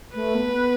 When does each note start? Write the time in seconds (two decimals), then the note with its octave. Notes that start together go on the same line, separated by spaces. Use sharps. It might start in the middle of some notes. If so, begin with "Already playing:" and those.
0.15 A3 B4
0.35 B3
0.53 B3